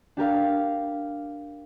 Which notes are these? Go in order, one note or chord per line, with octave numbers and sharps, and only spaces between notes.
D4 G4 A#4 F5